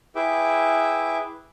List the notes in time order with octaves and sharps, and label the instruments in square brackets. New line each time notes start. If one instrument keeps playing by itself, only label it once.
[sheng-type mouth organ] E4 G#4 B4 E5 G5 D6